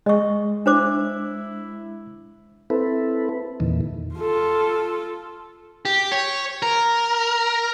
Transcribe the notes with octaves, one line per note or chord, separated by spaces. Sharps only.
G#3 D#5 C#6
D4 E4 C5 D6
C4 E4 A4 B4
E2 A#2 D#3 E3
F4 A4
G4
C#5
A#4